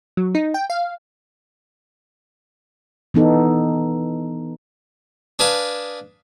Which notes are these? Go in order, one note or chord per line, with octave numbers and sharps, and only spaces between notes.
F#3
D#4
G5
F5
E3 B3 D#4 A4
D4 G#4 B4 F5 A5